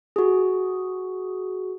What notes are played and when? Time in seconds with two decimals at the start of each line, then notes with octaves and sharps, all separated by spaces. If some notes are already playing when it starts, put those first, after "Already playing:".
0.16 F#4 G#4